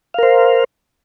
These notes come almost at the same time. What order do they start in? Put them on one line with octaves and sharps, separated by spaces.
F5 A#4 C5